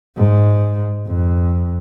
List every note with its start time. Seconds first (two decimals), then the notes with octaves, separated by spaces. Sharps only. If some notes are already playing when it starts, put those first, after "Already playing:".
0.17 G#2
1.07 F2